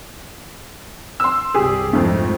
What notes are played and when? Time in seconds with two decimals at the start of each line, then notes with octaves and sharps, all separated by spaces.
1.20 C6 E6
1.54 C2 G2 G3 G4 G#4
1.93 F2 G#2 A3